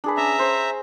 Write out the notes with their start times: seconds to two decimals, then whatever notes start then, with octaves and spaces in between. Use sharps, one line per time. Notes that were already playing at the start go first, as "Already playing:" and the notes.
0.04 D4 G#4 B4
0.17 C#4 E5 A#5
0.39 C5